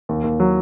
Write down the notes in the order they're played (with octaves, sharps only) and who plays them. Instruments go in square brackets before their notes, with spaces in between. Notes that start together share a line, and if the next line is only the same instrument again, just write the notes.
[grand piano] D#2
D#2
F#3